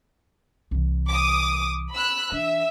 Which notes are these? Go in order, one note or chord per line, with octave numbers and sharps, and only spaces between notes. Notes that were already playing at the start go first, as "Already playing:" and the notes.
C2 E3
D6 D#6
B5 E6 F#6
E3 D4 E5